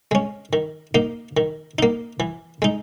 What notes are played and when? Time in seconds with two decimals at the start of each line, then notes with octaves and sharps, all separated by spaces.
0.11 G#3 C#4
0.53 D#3
0.95 A#3 D#4
1.37 D#3
1.79 A#3 D#4
2.20 E3
2.62 G#3 D#4